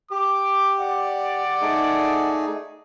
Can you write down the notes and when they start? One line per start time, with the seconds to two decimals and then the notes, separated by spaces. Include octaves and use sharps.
0.11 G4 D6
0.79 D5 F#5
1.62 A3 D#4 G#4